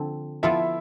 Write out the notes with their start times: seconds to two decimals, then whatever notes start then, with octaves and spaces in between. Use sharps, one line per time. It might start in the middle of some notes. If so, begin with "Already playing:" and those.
Already playing: D3 F3 C4 A4
0.43 F3 B3 E4 F4 A4 E5